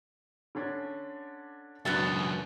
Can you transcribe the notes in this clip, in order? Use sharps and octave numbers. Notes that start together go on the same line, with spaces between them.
D3 C#4 D4
C#2 F#2 B2 B3 D4 E5 A5